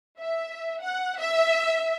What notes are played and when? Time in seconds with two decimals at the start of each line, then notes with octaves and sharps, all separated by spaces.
0.20 E5
0.81 F#5
1.19 E5